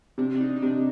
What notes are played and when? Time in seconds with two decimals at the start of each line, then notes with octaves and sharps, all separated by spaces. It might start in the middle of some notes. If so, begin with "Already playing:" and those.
0.18 C3 D4
0.35 D4
0.40 D#4
0.56 D#4
0.62 C3 D4